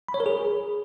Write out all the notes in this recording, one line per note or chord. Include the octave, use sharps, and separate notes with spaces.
B5
C#5
A#4
G#4